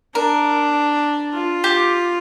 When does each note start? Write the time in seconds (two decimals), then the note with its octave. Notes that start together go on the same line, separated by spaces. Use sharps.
0.15 D4 A#4
1.33 F4
1.64 G4